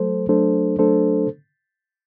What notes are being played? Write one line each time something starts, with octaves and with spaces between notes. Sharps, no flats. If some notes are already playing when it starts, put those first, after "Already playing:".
Already playing: F#3 A3 A4 C5
F#3 A3 D4 A4 C5
F#3 A3 D4 A4 C5